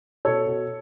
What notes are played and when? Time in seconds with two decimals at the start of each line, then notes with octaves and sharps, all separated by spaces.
0.25 B2 A4 C#5
0.46 B2